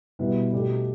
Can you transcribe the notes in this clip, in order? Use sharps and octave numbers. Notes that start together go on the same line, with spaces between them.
B2 G3 B3 E4
B2 A3 D4 G4